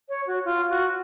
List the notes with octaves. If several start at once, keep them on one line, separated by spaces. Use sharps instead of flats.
C#5
F#4
F4
F#4